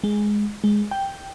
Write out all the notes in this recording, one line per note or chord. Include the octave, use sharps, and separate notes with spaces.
G#3
G#3
G5